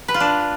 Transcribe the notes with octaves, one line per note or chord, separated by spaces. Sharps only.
B4
F4
D4